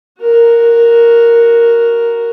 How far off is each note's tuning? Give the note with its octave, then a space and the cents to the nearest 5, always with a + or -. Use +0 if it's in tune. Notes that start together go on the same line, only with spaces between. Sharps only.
F#4 +0 A#4 +0